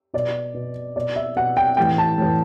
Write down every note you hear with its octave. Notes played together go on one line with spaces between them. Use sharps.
B2 D5
B2
B2 D5
E5
B2 F#5
G5
A2 E3 G5
A5
A2 E3